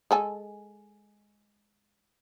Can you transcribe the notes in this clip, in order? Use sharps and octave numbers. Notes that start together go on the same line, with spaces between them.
G#3 A4 G#5